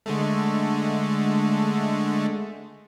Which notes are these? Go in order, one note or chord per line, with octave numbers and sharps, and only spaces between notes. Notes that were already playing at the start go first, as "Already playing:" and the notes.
D3 G#3 A3